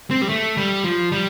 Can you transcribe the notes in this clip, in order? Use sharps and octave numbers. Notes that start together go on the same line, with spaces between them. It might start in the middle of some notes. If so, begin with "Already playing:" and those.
C4
G3
A3
G3
F3
G3